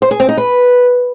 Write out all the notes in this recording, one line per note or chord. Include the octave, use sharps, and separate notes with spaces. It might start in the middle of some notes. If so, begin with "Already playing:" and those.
C5
G#4
C4
D#4
B4